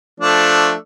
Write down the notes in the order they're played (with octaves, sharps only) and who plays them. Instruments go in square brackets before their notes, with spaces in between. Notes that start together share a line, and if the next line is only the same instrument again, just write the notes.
[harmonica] F3 A3 D4